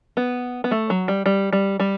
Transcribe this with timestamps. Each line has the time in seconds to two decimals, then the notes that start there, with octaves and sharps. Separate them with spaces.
0.17 B3
0.64 B3
0.71 A3
0.90 F#3
1.08 G3
1.26 G3
1.53 G3
1.80 G3